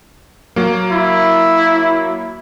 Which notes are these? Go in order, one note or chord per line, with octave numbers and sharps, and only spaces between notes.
F#3 A#3
E4